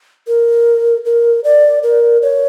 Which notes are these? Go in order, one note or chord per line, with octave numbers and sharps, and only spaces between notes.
A#4
A#4
D5
A#4
C#5